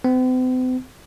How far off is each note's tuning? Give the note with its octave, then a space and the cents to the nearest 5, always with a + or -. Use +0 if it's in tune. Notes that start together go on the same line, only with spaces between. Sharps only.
C4 -45